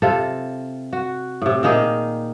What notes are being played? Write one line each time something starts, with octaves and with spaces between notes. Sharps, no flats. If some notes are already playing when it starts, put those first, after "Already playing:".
C3 F4 A4
F#4
A2 C3
A#2 D#3 D#4 G#4